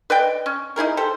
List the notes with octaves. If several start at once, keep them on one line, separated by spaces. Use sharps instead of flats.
B4 D5 D#5 G5
C#4
D#4 E4 G#4 A#4
G4 A4 C5